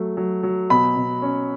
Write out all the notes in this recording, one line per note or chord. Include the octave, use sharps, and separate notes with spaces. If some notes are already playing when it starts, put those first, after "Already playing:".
Already playing: F#3 A3
F#3
F#3
B2 B5
B2
C#4